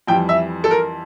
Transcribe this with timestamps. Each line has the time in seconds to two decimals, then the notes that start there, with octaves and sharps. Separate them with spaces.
0.07 F2 E3 G3 G5
0.29 E5
0.64 A4
0.71 A#4